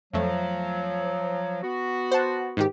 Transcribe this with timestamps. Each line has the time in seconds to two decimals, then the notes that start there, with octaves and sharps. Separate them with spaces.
0.13 F2 F3 F#3 A3
1.63 B3 F#4
2.11 C5 F#5 A5
2.57 G#2 D#3 G4